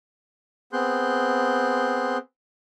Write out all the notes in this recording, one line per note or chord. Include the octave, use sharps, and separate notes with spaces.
B3 C4 G#4 C6 F#6 G6